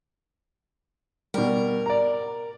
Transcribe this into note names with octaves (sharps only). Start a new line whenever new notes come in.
B2 G3 A#4
D5 A#5